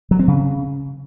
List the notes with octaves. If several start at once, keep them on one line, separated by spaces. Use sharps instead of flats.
F#3
C4
C#3